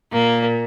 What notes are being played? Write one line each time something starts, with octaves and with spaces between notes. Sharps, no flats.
A#2 A#3